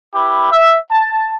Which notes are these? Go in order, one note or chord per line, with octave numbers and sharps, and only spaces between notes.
E4 G4 B4
E5
A5